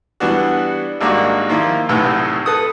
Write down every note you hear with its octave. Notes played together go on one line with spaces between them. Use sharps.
E3 G3 B3 D4 F#4
G#1 G3 A#3 D4 F#4 D5
D#3 F3 A#3 E4 F4
B1 E2 A2 C3 B3
A4 B4 D#6